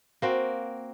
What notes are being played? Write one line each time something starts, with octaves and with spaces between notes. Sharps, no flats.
A#3 C4 F#4